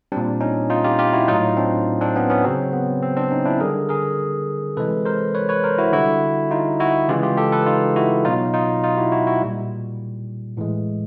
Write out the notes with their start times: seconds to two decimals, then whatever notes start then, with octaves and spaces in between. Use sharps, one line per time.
0.12 G3 C4 D4
0.17 A#2
0.41 C#4 D#4
0.70 D#4 F4
0.84 F4 G4
0.99 F4 G4
1.13 E4 F#4
1.28 A2 F#3 D#4 F4
1.57 C4 D4
2.01 C4 D4
2.16 B3 C#4
2.30 B3 C#4
2.44 C#3 F#3 C4
2.73 B3
3.02 C4
3.17 C4 D4
3.32 C#4 D#4
3.45 D4 E4
3.60 D3 G3 G#4 A#4
3.89 G#4 A#4
4.77 C3 E3 G#3 A4 B4
5.05 A#4 C5
5.35 B4 C#5
5.49 B4 C#5
5.64 A#4 C5
5.78 E4 F#4
5.92 D3 G3 E4 F#4
6.51 D#4 F4
6.80 E4 F#4
7.09 C#3 E3 G#3 F4 G4
7.23 F4 G4
7.37 G4 A4
7.52 A4 B4
7.66 D#4 F4
7.96 E4 F#4
8.25 B2 F#3 D#4 F4
8.54 D#4 F4
8.83 D#4 F4
8.97 E4 F#4
9.12 E4 F#4
9.27 E4 F#4
9.42 A#2 G3
10.57 A2 E3 G#3